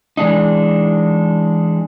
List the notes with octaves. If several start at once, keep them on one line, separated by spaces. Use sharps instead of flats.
E3 G#3 D4 D#4